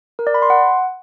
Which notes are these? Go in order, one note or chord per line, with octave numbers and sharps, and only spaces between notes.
A#4
D5
B5
C6
F#5